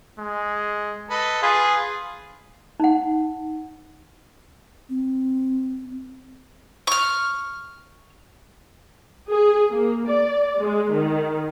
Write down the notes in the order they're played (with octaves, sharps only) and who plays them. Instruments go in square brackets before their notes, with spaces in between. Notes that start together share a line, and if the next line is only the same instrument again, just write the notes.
[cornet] G#3
[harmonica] A4 B4 D#5
[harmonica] F4 B4 [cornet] G#4
[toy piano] D#4 F#5
[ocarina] C4
[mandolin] C#6 F6
[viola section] G#4
A#3
D5
G#3
D#3